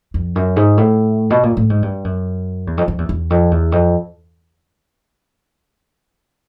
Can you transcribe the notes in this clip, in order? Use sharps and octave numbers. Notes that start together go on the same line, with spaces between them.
F2
F#2
G#2
A2
B2
A#2
A2
G#2
G2
F#2
E2
F2
F2
E2
E2
F2
E2
F2